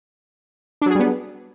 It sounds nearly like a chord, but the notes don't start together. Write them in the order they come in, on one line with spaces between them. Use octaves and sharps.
D4 F#3 G#4 G3 B3